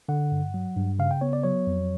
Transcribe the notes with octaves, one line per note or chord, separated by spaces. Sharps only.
D3 F#5
G2
F#3
G2
C#3 F5
G5
B3 C#5
D5
F#3 C#5
F2